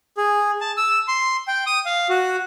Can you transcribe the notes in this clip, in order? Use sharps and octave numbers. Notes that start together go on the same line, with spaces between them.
G#4
A5
E6
C6
G5
D#6
F5
F#4